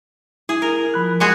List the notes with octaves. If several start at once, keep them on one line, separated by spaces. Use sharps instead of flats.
E4 G#4
A#4
F3 B5 F#6
G#3 F#4 G#4